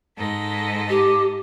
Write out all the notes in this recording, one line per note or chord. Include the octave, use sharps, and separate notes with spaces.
G#2 A4 D#5
G4